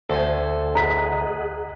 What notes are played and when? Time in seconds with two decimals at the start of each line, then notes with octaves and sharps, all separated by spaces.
0.10 D2 A4 C5 G#5
0.75 G#4 D#5 F#5 A#5 B6